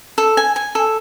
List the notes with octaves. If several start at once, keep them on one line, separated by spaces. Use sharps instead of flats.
A4
G#5
G#5
A4